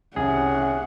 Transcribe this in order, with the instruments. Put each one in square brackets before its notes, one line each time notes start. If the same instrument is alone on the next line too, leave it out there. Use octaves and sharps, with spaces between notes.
[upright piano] C2 [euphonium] C#4 [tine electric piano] G#4 [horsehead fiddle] F#5